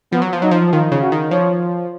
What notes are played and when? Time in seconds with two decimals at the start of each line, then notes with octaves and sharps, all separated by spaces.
0.12 F3 B3
0.22 F#3
0.33 F3
0.42 F#3 D#4
0.51 F3
0.72 D#3 F4
0.92 C#3
1.02 F#4
1.12 D#3
1.31 F3 C#5